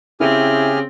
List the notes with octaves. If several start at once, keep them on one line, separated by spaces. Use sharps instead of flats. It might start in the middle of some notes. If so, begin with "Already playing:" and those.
C#3 C4 E4 G4 G#4 F6